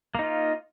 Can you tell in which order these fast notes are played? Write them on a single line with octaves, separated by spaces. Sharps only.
A#3 D#4 F4